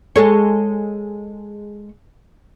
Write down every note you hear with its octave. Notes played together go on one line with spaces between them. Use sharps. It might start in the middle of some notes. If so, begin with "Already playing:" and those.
G#3 A4 C#5